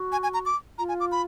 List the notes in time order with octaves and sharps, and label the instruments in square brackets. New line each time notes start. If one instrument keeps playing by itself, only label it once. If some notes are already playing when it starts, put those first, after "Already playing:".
Already playing: [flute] F#4
[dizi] G#5
G#5
A#5
D6
[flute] F4 [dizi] A#5
[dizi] G#5
D6
B5